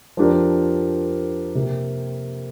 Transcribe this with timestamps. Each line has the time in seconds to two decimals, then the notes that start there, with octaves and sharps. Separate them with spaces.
0.17 F2 F3 D4 G4 A#4
1.55 C3 A#3 G4 A#4